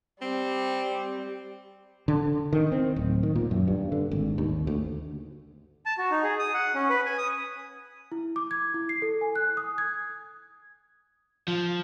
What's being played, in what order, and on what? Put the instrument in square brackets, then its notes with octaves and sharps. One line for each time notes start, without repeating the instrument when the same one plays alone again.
[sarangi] G3 [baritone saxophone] C4
[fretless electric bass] D3
D#3
C4
D1
D#3
A#2
F#2
G2
D3
G#1
D#2
D2
[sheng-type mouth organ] A5
F#4
D#4
G#4
D#6
F#5
C#4
B4
G#5
D#6
[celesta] E4
D6
G#6
E4
C7
A4
G#5
F#6
D#6
G#6
[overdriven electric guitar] F3